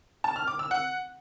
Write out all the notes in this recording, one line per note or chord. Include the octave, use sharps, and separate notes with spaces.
A5
F6
D6
E6
F#5